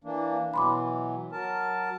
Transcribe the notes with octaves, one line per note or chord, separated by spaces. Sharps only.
E3 A#3 D4
B2 E3 F#3 B5 C6 D6
F#3 A#4 A5